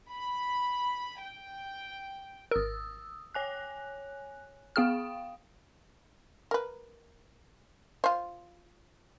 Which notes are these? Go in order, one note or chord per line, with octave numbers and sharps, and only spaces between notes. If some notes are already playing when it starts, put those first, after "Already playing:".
B5
G5
G#1 A#4 D#6 E6
C#5 G#5 F#6
B3 G#4 F5 G5 D#6 F6
A#4 B4
F4 C5